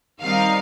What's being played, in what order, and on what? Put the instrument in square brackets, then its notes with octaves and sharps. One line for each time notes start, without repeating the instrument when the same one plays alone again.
[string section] D#3 G3 C4 D#4 F5